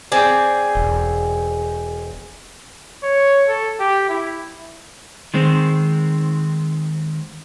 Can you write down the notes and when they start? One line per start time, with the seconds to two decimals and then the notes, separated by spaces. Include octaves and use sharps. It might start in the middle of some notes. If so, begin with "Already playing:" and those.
0.12 C4 G#4 D5
0.75 E1
3.03 C#5
3.48 A4
3.80 G4
4.09 E4
5.34 D#3 G#3 C4